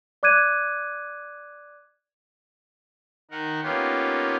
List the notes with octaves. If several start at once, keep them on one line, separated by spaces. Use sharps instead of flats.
D5 D6 F#6 G#6 D#7
D#3 D#4 A#4 F#5
A#3 B3 C#4 D#4 F4 G4